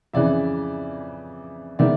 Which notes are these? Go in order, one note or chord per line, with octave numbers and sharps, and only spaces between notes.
F2 C#3 E3 D5 E5
D#3 G#3 B3 D5 E5